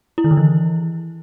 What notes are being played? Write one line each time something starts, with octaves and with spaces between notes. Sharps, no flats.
E4
D#3
D3
E3